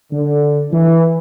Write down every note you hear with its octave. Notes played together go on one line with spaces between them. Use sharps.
D3
E3